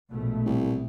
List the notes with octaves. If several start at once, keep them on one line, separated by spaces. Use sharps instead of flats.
A#1 B2 A3
C2